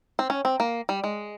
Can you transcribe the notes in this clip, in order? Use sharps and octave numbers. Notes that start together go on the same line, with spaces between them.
C4
C#4
C4
A#3
G3
G#3